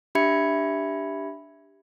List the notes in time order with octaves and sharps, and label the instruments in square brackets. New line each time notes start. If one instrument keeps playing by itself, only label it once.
[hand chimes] D4 G4 E5 B5 G#6 C#7